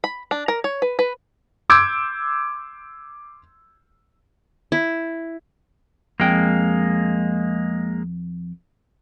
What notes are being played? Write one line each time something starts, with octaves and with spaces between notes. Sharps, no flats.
B5
D4
A#4
C#5
B4
B4
C6 D6 E6 G6 G#6 D7
E4
F2 G#3 A#3 G5